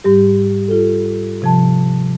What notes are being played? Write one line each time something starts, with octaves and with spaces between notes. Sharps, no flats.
G#2 G3 G4
F4 A4
C3 F3 A5